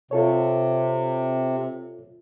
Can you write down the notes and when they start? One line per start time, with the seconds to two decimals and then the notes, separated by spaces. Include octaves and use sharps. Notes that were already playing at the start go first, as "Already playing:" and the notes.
0.11 C3 F4 A4 C#5